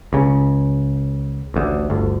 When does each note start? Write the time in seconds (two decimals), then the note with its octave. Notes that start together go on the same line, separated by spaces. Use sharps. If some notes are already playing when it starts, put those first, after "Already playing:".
0.13 C#2 C#3
1.54 A1 D2
1.90 G1 D2